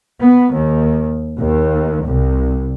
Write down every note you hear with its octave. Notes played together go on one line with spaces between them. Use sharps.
B3
D#2
D#2
C2